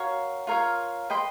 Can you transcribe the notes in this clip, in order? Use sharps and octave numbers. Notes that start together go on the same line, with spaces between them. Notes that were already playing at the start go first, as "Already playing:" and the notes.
Already playing: F#4 A#4 C#5 F5
F4 A#4 C#5 F5
B4 D#5 G5 C6